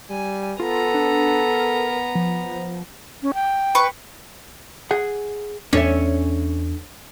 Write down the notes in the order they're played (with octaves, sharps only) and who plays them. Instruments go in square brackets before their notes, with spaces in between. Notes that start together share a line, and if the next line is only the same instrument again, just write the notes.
[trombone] G3 [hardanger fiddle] G#5
[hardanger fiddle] B3 A#5 [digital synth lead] F4 [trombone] A4
[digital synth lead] D4
A#4
F3
[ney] C#4
G5
[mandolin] B4 C#6
[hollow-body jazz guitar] G#4 F#5
[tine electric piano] E2 [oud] C#4 [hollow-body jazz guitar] D4 A4 E5